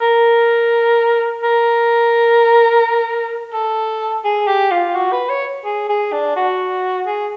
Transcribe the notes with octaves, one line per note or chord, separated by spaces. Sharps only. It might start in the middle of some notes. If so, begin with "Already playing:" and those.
A#4
A#4
A4
G#4
G4
F4
F#4
B4
C#5
G#4
G#4
D4
F#4
G#4